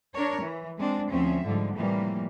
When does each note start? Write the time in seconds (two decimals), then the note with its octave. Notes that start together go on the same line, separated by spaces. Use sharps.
0.13 D4 A#4 C#5
0.42 E3
0.78 G#3 C4 D4
1.09 D2 F3 C4 C#4 E5
1.44 G#2 D3 F3 G3
1.74 A2 C3 E3 F3 G3 A#3